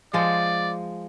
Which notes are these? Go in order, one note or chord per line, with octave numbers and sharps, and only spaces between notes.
F3 G#3 F4 D5